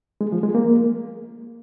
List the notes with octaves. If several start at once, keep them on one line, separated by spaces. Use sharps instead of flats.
G#3
F3
G#3
A#3